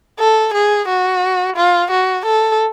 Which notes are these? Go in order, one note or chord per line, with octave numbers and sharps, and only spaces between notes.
A4
G#4
F#4
F4
F#4
A4